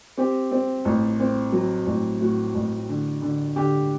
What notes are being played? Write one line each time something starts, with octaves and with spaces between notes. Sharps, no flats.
C4 G4
C4
A1
C4
F#3
A1
A2 F#4
A1
D3
D3
D3 G4